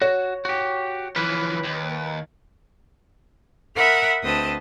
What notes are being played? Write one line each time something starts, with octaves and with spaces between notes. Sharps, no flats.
F#4 C#5
F#4 G4
E3 F3 B4
D#2
A#4 E5 F#5 B5 D#6 F6
D2 C4 B4 D#5 A5 D#6